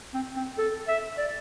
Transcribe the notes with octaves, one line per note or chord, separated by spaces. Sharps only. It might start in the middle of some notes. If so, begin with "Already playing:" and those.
C4
C4
A4
E5
D5